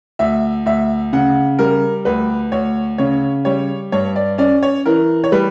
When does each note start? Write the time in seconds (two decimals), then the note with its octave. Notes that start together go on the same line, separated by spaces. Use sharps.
0.19 D2 E5
0.66 D2 E5
1.13 C#3 F#5
1.59 G3 A#4
2.05 D2 B4
2.52 D2 C#5
2.98 C#3 C#5
3.45 G3 C#5
3.92 G2 C#5
4.16 D5
4.38 C#4 D5
4.63 C#5
4.86 E3 A#4
5.24 C#5
5.32 G3 B4